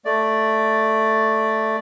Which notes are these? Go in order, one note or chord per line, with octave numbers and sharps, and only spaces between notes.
A3 D5